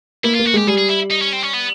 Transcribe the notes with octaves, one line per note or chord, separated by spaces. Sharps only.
A#3 E4
A#3 F4
F#4
G#3 G4
G3 G#4
G#4
E4
D#4
C#4
C4
C#4
B3